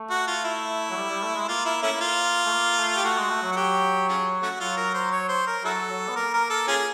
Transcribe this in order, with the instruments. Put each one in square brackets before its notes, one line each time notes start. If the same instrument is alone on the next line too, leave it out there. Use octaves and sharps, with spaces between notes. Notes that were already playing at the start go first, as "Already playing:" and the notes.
Already playing: [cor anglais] A3
[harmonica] F#4
F4
E4
[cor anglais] F#3
G3
G3
A3
G#3
[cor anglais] A#3 [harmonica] F4
[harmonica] E4
A3 C#4 E4
F4
[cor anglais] A3
A#3
A3
[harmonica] G4
[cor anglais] A3 [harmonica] F#4
[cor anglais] G#3
A3
F#3
[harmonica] F#4
G4
C#4 F4 G#4
A3 C#4 F#4
[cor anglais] F#3 [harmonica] F4
[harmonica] A#4
C5
C#5
C5
A#4
[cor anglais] F#3 [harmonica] E4 F#4 A4
[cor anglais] F#3
B3
[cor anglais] A#3 [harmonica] A#4
[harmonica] A#4
A4
C#4 F4 G#4